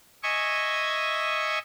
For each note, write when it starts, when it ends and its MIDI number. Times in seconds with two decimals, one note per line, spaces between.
0.23 1.59 75
0.23 1.59 76
0.23 1.59 80
0.23 1.59 85